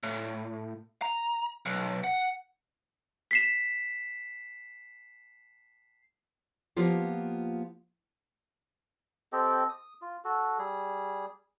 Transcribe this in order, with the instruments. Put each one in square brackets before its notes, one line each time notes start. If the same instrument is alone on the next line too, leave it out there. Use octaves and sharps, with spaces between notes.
[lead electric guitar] A2
A#5
B1
F#5
[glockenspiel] B6 C7 E7
[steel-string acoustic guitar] F3 A#3 B3 F4 G4
[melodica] C4 G4 A4 D#5
D#6
F4
F#4 A4
G3 G#4